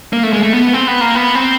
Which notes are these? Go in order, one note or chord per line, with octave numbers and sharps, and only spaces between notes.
A#3
A3
G#3
A3
B3
C4
B3
A#3
B3
C4